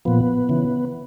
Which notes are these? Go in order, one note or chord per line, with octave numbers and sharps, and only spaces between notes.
A#2 F3 B3
C#3 E3